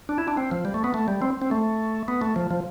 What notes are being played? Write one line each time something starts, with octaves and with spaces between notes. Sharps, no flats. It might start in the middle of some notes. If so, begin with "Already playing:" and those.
D4
E4
D4
C4
F3
G3
A3
B3
A3
G3
C4
C4
A3
B3
A3
F3
F3